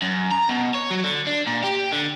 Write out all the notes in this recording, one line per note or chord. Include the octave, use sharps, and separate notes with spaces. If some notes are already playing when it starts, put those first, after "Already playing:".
F#2
A#5
B2
C#5
F#3
D3
D4
A#2
G4
D3